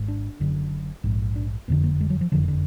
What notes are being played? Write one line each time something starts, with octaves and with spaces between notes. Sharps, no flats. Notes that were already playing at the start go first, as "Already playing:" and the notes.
Already playing: G#1 G#2
D4
F#1 F#2 D3
A#1 G#2
D4
F#1 F2 D3 B3
A#3
G#3
F#3
F3
F#1 F2 D3 F3
D#3
D3